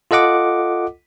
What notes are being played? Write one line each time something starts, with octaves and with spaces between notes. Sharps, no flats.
F4 A4 D#5 F#5 D6